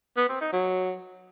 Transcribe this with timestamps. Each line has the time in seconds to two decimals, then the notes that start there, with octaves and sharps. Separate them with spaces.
0.17 B3
0.29 C4
0.41 D#4
0.53 F#3